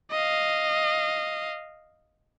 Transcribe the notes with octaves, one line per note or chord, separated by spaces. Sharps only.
D#5 F5